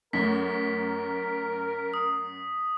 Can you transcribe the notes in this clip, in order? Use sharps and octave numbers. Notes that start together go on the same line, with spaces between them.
F#2 A3 A#4 B6
D#6